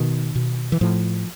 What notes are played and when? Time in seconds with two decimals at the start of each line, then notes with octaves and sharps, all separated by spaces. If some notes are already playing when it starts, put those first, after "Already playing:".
Already playing: B2 D#3
0.36 B2
0.72 E3
0.81 A2 F3